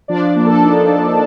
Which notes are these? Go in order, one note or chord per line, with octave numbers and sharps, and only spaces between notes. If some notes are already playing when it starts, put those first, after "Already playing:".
F3 D4 D5
A#3
A4 A5
D#4
F3